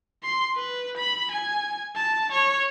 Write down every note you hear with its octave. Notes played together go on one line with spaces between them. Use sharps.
C6
B4
B5
G#5
A5
C#5